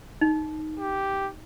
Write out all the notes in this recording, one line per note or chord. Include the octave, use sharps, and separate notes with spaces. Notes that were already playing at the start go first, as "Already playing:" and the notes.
D#4
G4